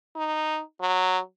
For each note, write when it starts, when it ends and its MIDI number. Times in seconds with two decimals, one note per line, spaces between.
0.16 0.61 63
0.81 1.18 54